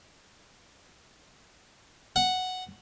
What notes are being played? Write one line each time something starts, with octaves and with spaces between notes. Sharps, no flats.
F#5